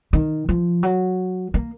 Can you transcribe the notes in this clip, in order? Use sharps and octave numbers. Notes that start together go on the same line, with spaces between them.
D#3
F3
F#3
A#3